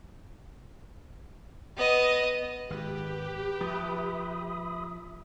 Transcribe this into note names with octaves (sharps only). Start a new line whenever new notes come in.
B3 D#5
G#1 G4 B4
F3 E5 B5 D#6